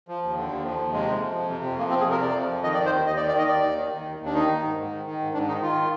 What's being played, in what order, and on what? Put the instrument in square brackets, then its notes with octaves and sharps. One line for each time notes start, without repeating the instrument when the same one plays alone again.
[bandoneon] F3
D#2
D3
D#2
F3
D#2
C3 G#3
F2
F3
F2
C3
F2
F3 A#3
C4
F2
G#4
C3 A#4
F2 D5
F3
F2
D#3 D#5
D5
D#3
C5
D#2
D#2 D#5
D5
D#3
D5
D#3 D#5
D#2 D5
D#2
D#3
D#3
D#2
D#2
D4
D#3 D#4
D#3
G#2
G#2
D#3
D#3
G#2
G#2 D4
D#3 D#4
D#3 F4